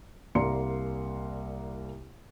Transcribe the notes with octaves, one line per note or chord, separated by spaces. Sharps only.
C2 A#3 D5 A#5 C6 C#7